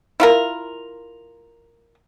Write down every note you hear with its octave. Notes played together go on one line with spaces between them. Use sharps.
E4 F4 A#4